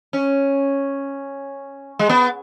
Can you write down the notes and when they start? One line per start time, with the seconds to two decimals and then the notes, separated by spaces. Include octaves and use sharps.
0.13 C#4
1.99 G#3
2.09 B3